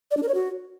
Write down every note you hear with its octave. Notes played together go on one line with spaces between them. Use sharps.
D5
D4
A#4
C#5
F#4